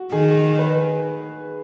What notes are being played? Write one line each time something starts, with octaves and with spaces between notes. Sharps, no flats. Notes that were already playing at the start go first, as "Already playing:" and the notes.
Already playing: F#4
D#3 G#4
B4